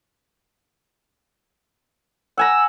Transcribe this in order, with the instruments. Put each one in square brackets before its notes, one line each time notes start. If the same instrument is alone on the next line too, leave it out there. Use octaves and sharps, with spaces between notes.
[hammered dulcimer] F#5 G#5 A#5 [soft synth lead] E6